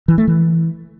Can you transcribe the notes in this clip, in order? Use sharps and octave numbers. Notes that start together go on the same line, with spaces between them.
E3
A3
E3